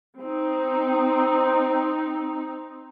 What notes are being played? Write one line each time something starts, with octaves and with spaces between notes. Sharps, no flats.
C4 D#4